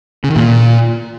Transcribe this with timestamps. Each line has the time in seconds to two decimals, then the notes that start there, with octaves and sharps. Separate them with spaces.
0.24 C#3
0.30 D#3
0.36 A#2